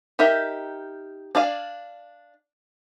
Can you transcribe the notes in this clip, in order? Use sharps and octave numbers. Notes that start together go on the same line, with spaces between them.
D#4 G4 A#4 E5
D4 D5 F5 G#5